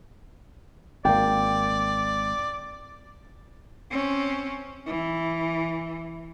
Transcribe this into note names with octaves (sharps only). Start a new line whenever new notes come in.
G#1 A#3 D5 G5
C4 C#4
E3